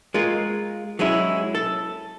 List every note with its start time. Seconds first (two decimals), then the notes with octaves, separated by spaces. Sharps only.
0.14 G#3 F4 A#4
0.99 F#3 G#3 C#4 E4
1.55 A4